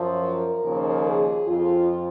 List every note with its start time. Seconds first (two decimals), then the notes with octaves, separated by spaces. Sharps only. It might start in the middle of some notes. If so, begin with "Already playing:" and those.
Already playing: F#2 F3
0.20 A#4
0.63 D#2 C#3 F3
1.06 G#4
1.48 F2 F3 F4